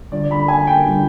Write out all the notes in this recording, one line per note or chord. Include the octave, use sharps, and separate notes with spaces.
D3 G3 D4 F4 D5
B5
G#5
G5
D3 G3 D4 F4